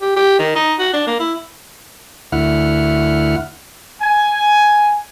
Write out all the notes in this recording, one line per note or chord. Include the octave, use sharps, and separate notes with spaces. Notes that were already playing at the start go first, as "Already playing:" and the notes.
G4
G4
D#3
D#4
F#4
D4
A#3
E4
D2 E4 F#5 F6
G#5